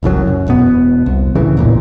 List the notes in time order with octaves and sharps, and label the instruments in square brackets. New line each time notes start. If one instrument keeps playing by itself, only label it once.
[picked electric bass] F#1 C2 F#2 F#3
F#2
E1 B2 B3
C2
A1 D2 C#3 E3
A1 E2 A#2